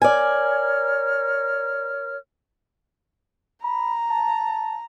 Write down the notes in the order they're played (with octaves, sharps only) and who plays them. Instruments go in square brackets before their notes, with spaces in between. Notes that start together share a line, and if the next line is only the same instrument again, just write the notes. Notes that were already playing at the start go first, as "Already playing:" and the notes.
[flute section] A#4 C#5 F6 [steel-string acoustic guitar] D5 G#5
[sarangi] A#5 [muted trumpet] B5
[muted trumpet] A5